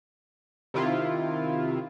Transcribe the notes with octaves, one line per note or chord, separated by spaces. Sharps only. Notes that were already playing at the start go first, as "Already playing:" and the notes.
C3 D#3 E4 F4